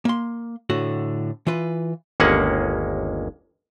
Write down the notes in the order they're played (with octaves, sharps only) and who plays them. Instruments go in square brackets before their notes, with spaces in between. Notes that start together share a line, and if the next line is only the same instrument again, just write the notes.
[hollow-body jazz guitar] A#3 C6
A2 D3 F#4
E3 F4 B4
[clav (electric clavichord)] G1 D#2 G#3 A#3 C#4 F#5